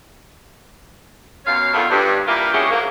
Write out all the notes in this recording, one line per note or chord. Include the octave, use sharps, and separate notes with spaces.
F#2 B2 C#5 F5
F2 B2 D3 D#3 E4 F4
G2
A#2 G3 A#3 E4 F4 A#4
G#3 C#4 E4 F#4 G4 C#5
G#2 F#3 A3 A#3